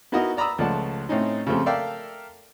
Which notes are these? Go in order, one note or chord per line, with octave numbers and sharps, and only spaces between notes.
B3 D#4 E4 F#4 A#4 D#5
D5 A#5 B5 D#6 E6
C#2 F3 A3 D5 F#5 A5
A2 C4 C#4 D#4
C#3 F3 A3 C4 G4
A4 A#4 D5 E5 F5 G5